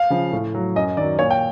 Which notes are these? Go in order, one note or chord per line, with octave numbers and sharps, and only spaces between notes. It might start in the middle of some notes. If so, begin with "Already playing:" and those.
Already playing: F5
C#3 F3
A2
F#3
F#2 D#5
D#3 F#3 D5
A#2 C#5
G5